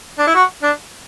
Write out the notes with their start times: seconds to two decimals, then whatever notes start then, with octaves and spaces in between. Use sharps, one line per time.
0.18 D4
0.27 E4
0.35 F#4
0.62 D4